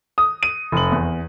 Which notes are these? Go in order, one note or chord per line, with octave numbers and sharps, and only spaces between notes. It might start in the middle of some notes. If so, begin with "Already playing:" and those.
D#6
D#7
F1 F#7
E2